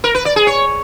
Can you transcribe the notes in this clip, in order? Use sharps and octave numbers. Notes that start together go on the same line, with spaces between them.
A#4
B4
D5
G#4
C#5